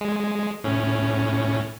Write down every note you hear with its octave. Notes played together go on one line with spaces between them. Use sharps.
G#3
A2 C#4